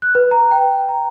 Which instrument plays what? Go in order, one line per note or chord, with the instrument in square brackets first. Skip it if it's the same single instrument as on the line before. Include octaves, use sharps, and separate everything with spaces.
[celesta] F#6
B4
A#5
G5
A#5